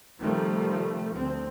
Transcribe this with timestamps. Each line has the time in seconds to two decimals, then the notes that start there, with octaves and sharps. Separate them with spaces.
0.21 C3 D#3 F3 G3 A3
1.13 D2 C4